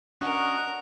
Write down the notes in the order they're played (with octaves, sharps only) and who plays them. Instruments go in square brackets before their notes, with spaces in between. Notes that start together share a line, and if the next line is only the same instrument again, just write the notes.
[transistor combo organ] C#4 F#4 D#5 [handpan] D4 F#5 [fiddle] A#4